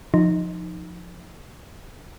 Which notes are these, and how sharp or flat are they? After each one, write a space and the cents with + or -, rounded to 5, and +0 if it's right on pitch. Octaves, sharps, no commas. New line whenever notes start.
F3 +10 D#4 +0